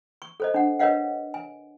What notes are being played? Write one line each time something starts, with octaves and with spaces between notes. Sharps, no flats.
C#6
A4 C5 D#5
D4 F#5
A#4 B4 C#5 D#5 F5 F#5
G#5